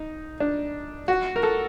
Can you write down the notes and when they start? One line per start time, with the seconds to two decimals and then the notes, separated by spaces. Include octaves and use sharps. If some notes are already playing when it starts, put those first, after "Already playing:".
Already playing: D#4
0.40 D4
1.08 F#4
1.36 A#4
1.43 A4